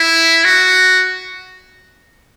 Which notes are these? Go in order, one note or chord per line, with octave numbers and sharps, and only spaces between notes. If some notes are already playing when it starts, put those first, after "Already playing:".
Already playing: E4
F#4